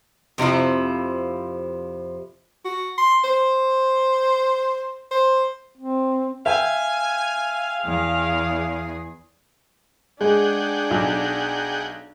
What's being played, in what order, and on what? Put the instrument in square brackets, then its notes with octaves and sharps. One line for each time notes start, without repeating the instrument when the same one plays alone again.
[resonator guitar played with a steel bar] F2 C3 F3 E4
[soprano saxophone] F#4
C6
C5
C5
[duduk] C4
[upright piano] E5 G5 [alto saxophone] F5 [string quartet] G#5
[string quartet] E2 G#4
[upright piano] G#3 [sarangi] D4 [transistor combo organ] G#4 F#5 G5
[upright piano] B1